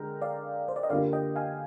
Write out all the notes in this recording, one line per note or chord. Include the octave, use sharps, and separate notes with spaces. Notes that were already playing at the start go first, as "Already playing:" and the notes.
Already playing: D3 G#3 A#4 G5 A#5
D5 F5
C5
D5
D#5
D3 G3 A#3 F4 D5 F5
D#5 G5
F5 G#5